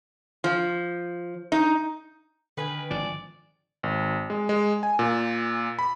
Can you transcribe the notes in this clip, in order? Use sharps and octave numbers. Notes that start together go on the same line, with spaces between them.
F3
D#4
D3 D#3 B4 G5 G#5
G#1 F3 D5
G#1
G#3
G#3
G#5
A#2
B5